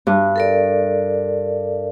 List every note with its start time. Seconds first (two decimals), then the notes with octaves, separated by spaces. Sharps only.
0.07 G2
0.36 A4 A#4 D5